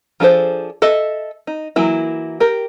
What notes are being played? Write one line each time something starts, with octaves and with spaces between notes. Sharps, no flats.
F3 D4 G#4 A4 C5
A4 D#5 E5
D#4
E3 F#3 A#3 E4
G4 A#4